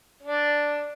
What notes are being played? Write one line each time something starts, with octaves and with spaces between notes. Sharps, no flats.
D4